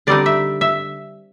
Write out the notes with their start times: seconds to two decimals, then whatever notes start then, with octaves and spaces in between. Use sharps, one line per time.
0.07 D3 G3 C4 D#4 D5
0.26 E5
0.61 E5